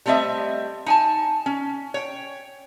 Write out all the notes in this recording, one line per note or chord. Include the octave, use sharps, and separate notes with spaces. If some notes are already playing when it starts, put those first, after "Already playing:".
G3 A3 C4 D#5 E5
D#4 G#5 A5
C#4
C#5 G5